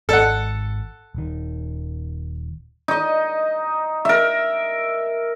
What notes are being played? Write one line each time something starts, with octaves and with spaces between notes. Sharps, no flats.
G#1 A4 F#5
D#1 D#3
D#4 D#5
A#4 E5